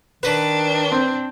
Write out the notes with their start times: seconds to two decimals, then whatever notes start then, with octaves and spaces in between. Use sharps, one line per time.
0.23 D#3 D4 B4
0.92 C4